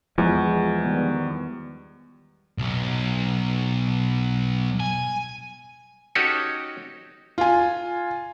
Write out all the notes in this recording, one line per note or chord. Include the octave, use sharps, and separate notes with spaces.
E2 F3 G#3
D#3 G3 B3
B1
G#5
C#4 D#4 F#4 G4 A4 C#5
F4 G#5